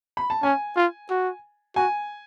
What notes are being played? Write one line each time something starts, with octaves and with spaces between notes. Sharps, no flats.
B5
A5
C#4 G#5
F4
F#4
F#4 G#5